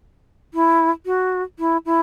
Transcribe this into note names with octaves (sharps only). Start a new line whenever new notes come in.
E4
F#4
E4
E4